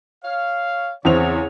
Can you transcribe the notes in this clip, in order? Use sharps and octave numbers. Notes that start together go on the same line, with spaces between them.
C#5 F5
E2 C#3 C4 C#5 F7